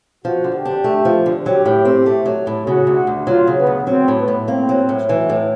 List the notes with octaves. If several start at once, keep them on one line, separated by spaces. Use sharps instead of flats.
F3 F#4
D3
G4
D4
A3
F3
D3
F#3 G4
A2
C4
A3
F#3
A2
C#3 F#4
D2
D2
F#3 F4
C#3
B3
D2
F#3 C4
A2
B3
A2
A#3 C4
F#3
A2
E3 F#3
A2